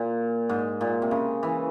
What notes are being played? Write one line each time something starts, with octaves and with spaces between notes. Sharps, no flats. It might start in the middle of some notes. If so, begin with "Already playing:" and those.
Already playing: A#2
G#2
A#2
C3
C#3
E3